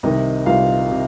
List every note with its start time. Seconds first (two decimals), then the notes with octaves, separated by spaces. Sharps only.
0.03 C2 C3 D#3 D#4 D#5
0.46 C2 C3 D#3 F4 F5
0.91 C3